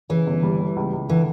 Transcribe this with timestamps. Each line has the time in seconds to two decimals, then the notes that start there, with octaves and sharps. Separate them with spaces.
0.09 C#3 E3
0.27 G1
0.43 G3
0.59 G3
0.76 C#2
0.93 C#2
1.09 D3 E3